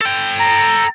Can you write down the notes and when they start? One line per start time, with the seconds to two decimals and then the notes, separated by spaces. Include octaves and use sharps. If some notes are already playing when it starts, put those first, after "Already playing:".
0.01 A4 G5
0.40 A#5